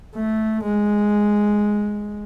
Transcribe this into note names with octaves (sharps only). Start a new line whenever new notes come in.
A3
G#3